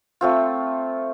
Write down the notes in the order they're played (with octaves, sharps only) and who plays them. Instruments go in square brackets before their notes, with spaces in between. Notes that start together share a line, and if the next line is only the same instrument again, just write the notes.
[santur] A3 C4 F4